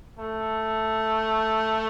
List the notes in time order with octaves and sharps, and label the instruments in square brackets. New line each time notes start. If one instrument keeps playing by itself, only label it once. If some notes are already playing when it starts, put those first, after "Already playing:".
[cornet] A3